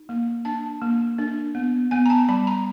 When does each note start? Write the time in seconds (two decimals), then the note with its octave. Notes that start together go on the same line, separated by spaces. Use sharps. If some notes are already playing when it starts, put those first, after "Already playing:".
Already playing: D#4
0.09 A#3
0.45 D4 A5
0.82 A#3
1.18 D4
1.55 B3
1.91 B3 G#5
2.06 A#5
2.10 A5
2.29 G3 B5
2.47 A#5